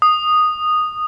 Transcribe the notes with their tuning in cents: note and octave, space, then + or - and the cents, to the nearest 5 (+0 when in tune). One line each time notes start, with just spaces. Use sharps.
D#6 -10